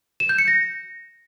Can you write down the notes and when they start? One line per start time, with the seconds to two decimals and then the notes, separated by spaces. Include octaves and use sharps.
0.20 E7
0.29 G6
0.38 C#7
0.48 A#6